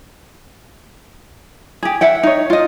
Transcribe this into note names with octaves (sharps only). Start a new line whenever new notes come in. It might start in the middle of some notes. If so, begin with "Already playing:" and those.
G4 G#4
E5 F#5 G5
D#4 C#5
F4 D#5